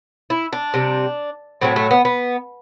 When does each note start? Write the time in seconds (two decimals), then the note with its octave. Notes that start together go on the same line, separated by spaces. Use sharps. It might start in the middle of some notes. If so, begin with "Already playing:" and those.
0.30 E4
0.53 D4
0.74 C3 G3
1.62 A2 F#3 A3 C4
1.76 A3
1.91 B3
2.05 B3